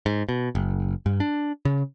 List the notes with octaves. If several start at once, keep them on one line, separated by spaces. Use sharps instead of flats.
G#2
B2
F#1
G2
D4
C#3